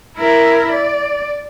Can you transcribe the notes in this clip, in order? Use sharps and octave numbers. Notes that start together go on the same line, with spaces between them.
E4 A#4
D5